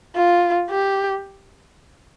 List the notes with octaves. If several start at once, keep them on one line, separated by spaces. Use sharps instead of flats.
F4
G4